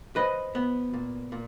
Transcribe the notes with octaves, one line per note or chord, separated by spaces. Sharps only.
F3 B4 D#5
B3
A#2
A#2